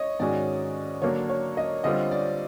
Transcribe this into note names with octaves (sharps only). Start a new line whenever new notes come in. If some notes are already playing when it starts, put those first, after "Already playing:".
Already playing: C#5 D#5
G#2 D#3 G#3 C#4 F#4 D5
D3 F#3 A#3 D4 C#5
C#5
D#5
D3 G3 C4 F4 D#5
D5